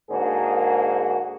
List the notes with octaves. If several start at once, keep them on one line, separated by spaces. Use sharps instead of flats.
G#2 D3 A#3 F#4 G#4